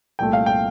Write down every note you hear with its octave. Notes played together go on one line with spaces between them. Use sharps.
C2 A#2 A3 G5
F5
G5